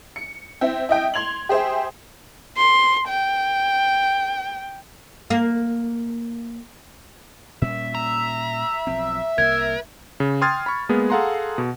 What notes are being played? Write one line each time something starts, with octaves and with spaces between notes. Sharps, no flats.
C#7
C4 E4
E4 D#5 G5
C6 G#6 F7 F#7
G4 G#4 C5 E5
C6
G5
A#3
A#2 G3 C#4 E5
A#5
B1 F3 C4
C2 F#3 A#3 A#4 G#6
C#3
G5 C6 D#6 F6 G#6 A6
B5 C#6
G#3 A#3 B3 G#4
G#4 A4 F5 F#5 A#5 C6
B2